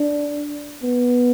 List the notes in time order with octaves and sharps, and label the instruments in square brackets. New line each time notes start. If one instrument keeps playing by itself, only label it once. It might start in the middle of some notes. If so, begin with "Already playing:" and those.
Already playing: [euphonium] D4
B3